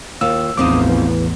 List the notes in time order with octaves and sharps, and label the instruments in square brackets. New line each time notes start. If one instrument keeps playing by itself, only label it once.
[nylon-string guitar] D#2 F4 [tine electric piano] E6
[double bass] A1 E2 [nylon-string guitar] F3 C4 D#4 [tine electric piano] D6 D#6
[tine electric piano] E3